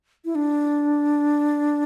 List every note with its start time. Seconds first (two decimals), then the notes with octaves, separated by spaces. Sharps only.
0.25 E4
0.35 D4